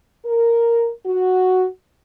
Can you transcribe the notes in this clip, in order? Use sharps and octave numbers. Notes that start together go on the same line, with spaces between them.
A#4
F#4